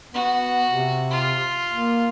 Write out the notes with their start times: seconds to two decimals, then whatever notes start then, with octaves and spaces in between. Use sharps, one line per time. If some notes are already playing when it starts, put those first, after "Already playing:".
0.14 B3 F#4
0.70 C3
1.11 F4
1.73 A#3